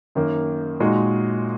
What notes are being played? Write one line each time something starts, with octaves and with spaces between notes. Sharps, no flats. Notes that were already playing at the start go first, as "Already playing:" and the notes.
F#2 D#3 A#3
A#2 G#3 D#4 F#4